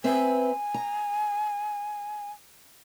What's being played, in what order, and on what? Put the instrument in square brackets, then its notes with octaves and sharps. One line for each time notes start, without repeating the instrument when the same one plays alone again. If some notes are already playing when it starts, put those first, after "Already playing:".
[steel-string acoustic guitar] C4 B4 E5 [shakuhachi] G#5
[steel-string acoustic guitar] A#5